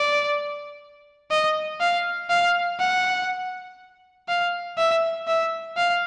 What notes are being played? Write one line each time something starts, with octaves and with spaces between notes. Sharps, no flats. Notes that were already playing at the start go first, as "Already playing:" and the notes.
Already playing: D5
D#5
F5
F5
F#5
F5
E5
E5
F5